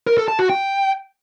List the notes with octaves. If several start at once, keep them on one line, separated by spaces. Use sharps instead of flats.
A#4
A4
A5
F#4
G5